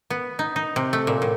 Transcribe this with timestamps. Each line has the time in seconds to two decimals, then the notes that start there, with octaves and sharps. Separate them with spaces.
0.10 B3
0.39 D#4
0.56 D#4
0.76 C3
0.93 A3
1.07 A#2
1.22 A2